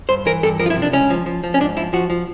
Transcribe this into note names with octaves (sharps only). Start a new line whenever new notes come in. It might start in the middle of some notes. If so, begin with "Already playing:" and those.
G2 C5
E3 A#4
G2 A4
F3 A#4
F4
E4
C3
D4
C#2 C#4
F3
F3
F3
C#4
G#2 D4
F3 E4
F3 F#4
F3